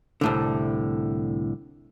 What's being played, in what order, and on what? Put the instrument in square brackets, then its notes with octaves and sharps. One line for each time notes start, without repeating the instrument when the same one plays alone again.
[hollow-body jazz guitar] C2 A2 D3